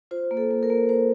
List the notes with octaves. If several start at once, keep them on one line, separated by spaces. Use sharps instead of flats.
F4 C5
A#3
A4
A#3
A#4
A#3
A#3 C5